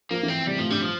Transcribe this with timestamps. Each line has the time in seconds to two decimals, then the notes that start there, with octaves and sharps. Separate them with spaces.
0.11 F3 A#3
0.23 E3
0.29 C4
0.47 C3 G3
0.59 A2 F3
0.71 G2 G3
0.82 F3